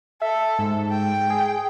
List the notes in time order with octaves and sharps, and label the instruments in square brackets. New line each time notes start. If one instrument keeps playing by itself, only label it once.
[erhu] A4 [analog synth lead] E5
[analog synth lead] G#2
[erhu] G5
[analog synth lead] G#4